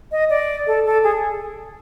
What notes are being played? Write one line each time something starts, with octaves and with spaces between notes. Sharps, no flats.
D#5
D5
A4
A4
G#4